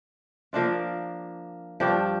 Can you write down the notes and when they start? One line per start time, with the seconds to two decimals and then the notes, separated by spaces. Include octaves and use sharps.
0.53 F3 A#3 D4 F4
1.80 G2 F3 D4 G4